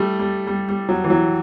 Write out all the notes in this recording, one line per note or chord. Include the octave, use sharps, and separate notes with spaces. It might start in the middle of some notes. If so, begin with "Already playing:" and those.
Already playing: G3 A3
G3
G3
G3
F#3
E3
F#3